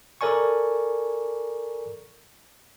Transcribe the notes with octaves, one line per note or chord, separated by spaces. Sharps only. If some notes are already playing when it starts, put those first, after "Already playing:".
A4 A#4 D5 G#5 C#6